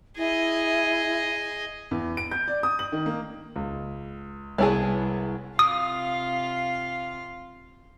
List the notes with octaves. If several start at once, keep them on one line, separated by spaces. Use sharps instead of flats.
E4 G#4 D#5
E2
D7
G6
D5
D#6
F#7
D#3
A#3
C#2
C2 B3 E4 G#4 C#5 A5
C3 F4 F5 D#6